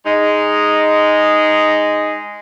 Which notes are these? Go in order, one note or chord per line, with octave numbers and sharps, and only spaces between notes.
G#3 D#4